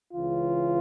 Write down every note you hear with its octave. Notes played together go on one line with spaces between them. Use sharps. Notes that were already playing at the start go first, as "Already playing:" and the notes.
C#2 C#3 E3 F4